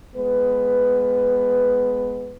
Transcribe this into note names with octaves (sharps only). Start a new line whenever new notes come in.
G#3 B3 B4